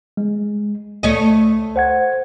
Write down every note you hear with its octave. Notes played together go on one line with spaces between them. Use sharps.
G#3
C#2 A3 C#5 D#5
C5 F#5 G#6